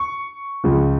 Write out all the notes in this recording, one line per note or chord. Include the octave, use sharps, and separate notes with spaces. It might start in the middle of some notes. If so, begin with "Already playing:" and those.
Already playing: C#6
C#2 C#3 F3